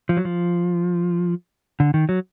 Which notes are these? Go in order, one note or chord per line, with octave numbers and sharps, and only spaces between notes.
F3
F#3
F3
D3
D#3
F#3